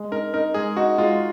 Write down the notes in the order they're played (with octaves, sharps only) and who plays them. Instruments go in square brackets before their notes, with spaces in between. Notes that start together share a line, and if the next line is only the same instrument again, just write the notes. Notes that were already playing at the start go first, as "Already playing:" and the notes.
Already playing: [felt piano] G#3
[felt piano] D#4 [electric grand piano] A#4
[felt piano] D#4 [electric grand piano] A#4
[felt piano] G#3 [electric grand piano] G#4
[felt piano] D#4 [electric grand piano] F#4
[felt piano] G#3 [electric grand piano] F4